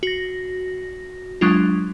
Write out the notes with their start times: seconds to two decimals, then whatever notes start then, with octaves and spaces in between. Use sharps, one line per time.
0.03 F#4 A#6
1.41 F#3 G#3 D4 F4